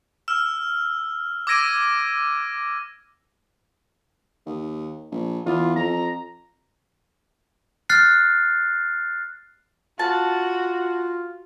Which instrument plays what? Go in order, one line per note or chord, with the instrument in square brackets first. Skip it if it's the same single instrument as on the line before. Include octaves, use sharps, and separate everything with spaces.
[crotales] E6 F6 E7
D6 E6 G#6 A#6 D7 D#7
[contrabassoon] D#2
A#1
[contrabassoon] E2 [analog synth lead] F4
[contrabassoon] F2 [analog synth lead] A#5
[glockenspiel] F6 F#6 A6 C7
[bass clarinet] F4 [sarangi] F#4 [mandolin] A5